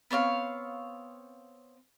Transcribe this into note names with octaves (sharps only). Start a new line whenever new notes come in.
B3 C4 C#5 F5